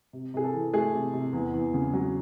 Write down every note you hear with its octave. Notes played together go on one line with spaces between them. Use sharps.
C3
C3 G#4
A4
E3
A3 G#4
C3
C3
E2
E2
C#3
F#3